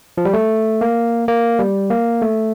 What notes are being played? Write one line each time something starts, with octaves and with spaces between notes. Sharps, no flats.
F3
G3
A3
A#3
A#3
G3
A#3
A3